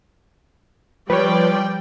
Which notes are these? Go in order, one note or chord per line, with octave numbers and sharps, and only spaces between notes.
F3 G3 B4 C#5 D5 G5